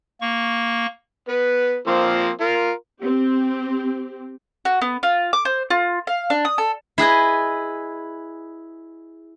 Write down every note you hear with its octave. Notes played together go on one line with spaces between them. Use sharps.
A#3 C#6
B3 B4
F3 A#3 C4
F4 A#4
C4 G4
F#4
B3
F4
D6
C5
F4
F5
D4
D#6
A4
E4 G#4 B4 D#5